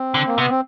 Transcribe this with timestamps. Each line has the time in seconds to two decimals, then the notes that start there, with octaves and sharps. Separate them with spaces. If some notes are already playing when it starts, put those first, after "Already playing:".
Already playing: C4
0.14 D3
0.27 A#3
0.38 C3 B3
0.50 C4